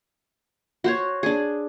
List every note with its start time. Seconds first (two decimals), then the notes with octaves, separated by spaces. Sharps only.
0.84 F#4 C5 C#5
1.23 D4 G#4